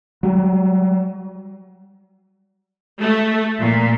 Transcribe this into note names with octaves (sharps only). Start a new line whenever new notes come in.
F#3 G3
A3
A#2